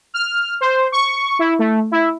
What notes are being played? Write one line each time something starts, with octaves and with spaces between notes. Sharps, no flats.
F6
C5
C#6
E4
A3
E4